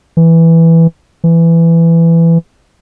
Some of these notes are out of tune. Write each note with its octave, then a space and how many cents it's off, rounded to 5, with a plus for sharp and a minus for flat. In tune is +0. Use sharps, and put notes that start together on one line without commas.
E3 +0
E3 +15